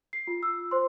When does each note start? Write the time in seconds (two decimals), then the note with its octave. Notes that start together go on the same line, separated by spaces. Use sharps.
0.13 C7
0.27 F4
0.43 E6
0.71 C5 C6